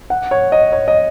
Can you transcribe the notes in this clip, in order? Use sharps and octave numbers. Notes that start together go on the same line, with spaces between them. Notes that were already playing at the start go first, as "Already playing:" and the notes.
F#5
C#5
D#5
C#5
D#5